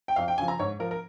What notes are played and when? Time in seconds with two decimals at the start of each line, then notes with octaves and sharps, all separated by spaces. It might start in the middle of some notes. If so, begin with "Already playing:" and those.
0.08 G5
0.16 F2 F5
0.28 G5
0.38 C#3 F3 G#5
0.48 A#5
0.59 G#2 C#5
0.80 F3 A#4
0.91 A#4